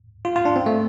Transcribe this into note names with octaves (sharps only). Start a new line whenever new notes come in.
F4
F4
D4
C4
A3